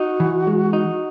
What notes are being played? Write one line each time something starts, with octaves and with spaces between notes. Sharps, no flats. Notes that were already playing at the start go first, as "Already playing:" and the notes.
Already playing: D#4 F#4
E3
G#3
D#4